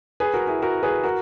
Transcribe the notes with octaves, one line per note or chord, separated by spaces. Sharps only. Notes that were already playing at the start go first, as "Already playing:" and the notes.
G#4 B4
F#4 A#4
E4 G#4
F#4 A#4
G#4 B4
F#4 A#4